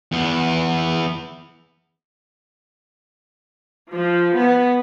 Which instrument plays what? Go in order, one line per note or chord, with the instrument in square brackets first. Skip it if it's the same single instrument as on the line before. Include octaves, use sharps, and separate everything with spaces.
[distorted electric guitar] E2 B3
[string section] F3
B3